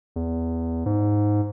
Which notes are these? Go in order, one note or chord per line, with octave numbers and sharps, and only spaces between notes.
E2
G#2